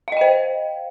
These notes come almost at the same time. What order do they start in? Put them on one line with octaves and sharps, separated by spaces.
F5 D#5 G5 C5